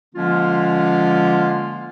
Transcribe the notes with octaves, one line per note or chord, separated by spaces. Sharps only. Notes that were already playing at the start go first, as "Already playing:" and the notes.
D3 F3 G#3 A#3 C#4 F4